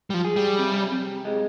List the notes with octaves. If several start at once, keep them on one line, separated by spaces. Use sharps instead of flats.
G3
F3
G#4
G3
C3
C3
G#3